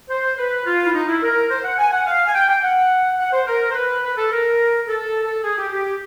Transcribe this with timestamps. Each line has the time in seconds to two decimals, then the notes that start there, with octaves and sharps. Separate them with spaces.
0.10 C5
0.38 B4
0.66 F4
0.86 E4
0.94 D#4
1.08 E4
1.22 A#4
1.50 C5
1.64 F#5
1.78 G#5
1.92 F#5
2.07 F5
2.27 G#5
2.35 G5
2.49 G5
2.63 F#5
3.19 F#5
3.33 C5
3.47 A#4
3.70 C5
3.75 B4
4.03 B4
4.17 A4
4.31 A#4
4.87 A4
5.43 G#4
5.58 G4
5.72 G4